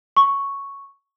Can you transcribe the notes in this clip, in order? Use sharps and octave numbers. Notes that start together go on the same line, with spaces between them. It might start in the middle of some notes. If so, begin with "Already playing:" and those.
C#6